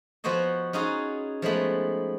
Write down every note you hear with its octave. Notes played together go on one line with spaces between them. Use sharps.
F3 B3 F#4 C5 C#5 D#5
C#4 D#4 F4 F#4 G#4
F3 G#3 A3 B3